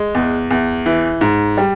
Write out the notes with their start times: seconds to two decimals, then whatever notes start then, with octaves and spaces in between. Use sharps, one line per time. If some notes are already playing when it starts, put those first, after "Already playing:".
Already playing: G#3
0.15 E2
0.51 E2
0.86 E3
1.21 G#2
1.58 G3